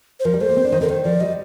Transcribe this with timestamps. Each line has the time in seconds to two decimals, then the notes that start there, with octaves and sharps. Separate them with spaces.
0.20 C5
0.25 F3 A#4
0.33 G3
0.41 A3 C5
0.49 A#3
0.57 C4
0.64 D4
0.72 D#3
0.81 D3 A#4
0.89 D#3 C5
1.04 F3 D5
1.21 G3 D#5